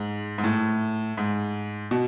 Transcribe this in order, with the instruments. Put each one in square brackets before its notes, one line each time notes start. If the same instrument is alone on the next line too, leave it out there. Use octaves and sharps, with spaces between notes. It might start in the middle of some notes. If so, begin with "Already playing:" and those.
Already playing: [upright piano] G#2
G#2
A2
G#2
B2